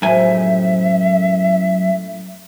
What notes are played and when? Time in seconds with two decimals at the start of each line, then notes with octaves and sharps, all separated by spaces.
0.02 F#2 A2 F3 G#3 E5 G#5